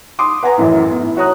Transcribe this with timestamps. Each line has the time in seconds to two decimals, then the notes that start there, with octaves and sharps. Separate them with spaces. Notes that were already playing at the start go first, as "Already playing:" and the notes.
0.19 C6 D6 D#6
0.43 B4 F#5 G#5 A#5
0.58 A1 F#2 A2
0.90 B3
1.02 A2
1.17 F#4 C#5 A#5 D#6 F#6